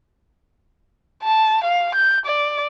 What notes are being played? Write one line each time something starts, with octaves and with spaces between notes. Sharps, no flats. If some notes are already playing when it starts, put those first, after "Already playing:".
A5
F5
G6
D5